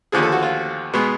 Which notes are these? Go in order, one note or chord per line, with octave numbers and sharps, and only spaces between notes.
D#2 D3 F3 G#4
A4
F#4
F4
B2 G#3 B3